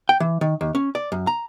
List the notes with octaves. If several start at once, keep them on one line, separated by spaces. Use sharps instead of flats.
G5
E3
D#3
D#2
C#4
D5
F#2
A#5